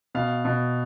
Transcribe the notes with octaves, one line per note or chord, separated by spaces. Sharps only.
B2 F5
B2